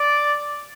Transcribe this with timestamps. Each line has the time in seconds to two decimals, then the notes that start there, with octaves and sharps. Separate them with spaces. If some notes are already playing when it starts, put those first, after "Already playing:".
Already playing: D5